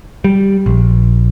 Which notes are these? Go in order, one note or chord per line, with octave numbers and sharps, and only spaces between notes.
G3
A#1